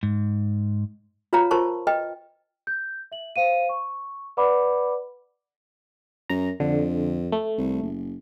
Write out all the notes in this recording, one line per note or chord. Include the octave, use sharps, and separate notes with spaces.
G#2
F4 B4 C#5 F5 A#5
F4 A#4 C5 A5 C#6
B4 D#5 G5
G6
E5 F#7
C5 F5 D#7
C#6
B4 D5 F#5 B5 D6
F#2 A#5
F2 D3
A3
C2
F#1